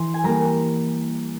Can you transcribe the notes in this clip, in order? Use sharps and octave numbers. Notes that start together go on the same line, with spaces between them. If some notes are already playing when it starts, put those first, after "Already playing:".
Already playing: E3 C6
G#5
G3 A#3 A#5